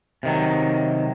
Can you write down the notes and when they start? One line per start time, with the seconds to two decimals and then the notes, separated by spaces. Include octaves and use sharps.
0.23 C3 D#3 F#3